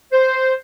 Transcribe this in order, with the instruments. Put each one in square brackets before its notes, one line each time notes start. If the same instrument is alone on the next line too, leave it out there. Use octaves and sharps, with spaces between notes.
[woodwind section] C5